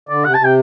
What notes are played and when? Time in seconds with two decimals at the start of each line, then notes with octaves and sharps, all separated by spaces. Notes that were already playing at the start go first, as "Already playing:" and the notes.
0.09 D3 D5
0.24 C3 F#5
0.34 A5
0.39 C3
0.44 G5